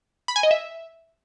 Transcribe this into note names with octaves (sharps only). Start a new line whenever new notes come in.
B5
G#5
D#5
E5